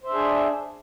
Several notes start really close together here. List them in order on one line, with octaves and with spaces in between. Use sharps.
C5 E5 D4 G#4